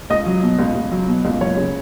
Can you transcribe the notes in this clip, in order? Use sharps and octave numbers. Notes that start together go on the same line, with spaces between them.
C#2 D#5
F#3
B2
C#2
C#2
F#3
B2
C#2
F#1 C#5
C#3